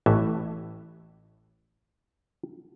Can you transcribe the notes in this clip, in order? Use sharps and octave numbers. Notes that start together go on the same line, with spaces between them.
A1 A2 E3 E5